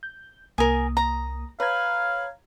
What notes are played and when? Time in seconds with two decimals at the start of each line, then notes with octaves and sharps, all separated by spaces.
0.03 G6
0.58 C2 A#3 A#4 G#5 D#6
0.97 A#5
1.60 B4 C#5 F5 A#5 G#6